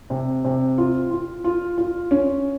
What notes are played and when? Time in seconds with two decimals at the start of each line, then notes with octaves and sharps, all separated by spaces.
0.10 C3
0.45 C3
0.78 F4
1.11 F4
1.44 F4
1.78 F4
2.11 C#4